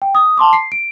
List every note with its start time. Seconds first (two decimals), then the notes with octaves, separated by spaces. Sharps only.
0.02 G5
0.15 D#6
0.37 A5 C6 D6
0.53 C7
0.72 D7